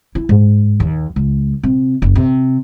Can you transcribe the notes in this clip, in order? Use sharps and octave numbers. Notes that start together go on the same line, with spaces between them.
E4
G#2
D#2
C#2
C3
F#1
C3